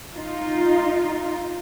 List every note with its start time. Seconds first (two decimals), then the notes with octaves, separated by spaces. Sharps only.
0.12 D#4 F4